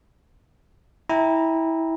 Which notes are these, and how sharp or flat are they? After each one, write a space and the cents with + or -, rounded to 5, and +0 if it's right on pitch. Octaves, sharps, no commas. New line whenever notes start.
E4 -20 G5 +20 A#5 -10